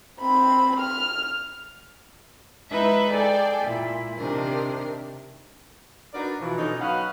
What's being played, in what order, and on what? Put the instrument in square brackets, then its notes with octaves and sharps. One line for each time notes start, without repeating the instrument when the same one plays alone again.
[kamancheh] C4 B5
F6
[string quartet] G#3 D#4 E4 B4 E5 B5
G#4 A4 D5 G5
A#2 E4
C3 D#3 D4 A#4
[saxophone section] D4 D#4 F#4 A#4 B4 D5
B2 E3 F3
B2 D3 C#4 D#4
F#3 C#4 D#4 B4 F5 F#5